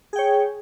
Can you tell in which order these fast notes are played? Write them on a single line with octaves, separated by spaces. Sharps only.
G#4 G5 C#5